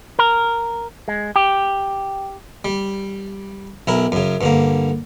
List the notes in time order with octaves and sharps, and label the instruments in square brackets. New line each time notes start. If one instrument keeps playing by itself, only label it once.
[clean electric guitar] A#4
G#3
G4
[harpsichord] G3
B1 E4 A#4
F#2 C#3
G2 D3 A#3